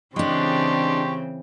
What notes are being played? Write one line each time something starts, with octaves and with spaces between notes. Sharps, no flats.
C#3 E3 G#3 C4 D4 G4 C6 C#6